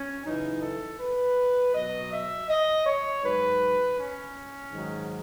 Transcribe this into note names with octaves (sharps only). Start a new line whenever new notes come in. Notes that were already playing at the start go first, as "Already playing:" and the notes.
Already playing: C#4
F#2 C#3 E3 D#4
A4
B4
B2 F#3 D#5
E5
D#5
C#5
G#2 F#3 B4
C#4
G#2 D#3 F#3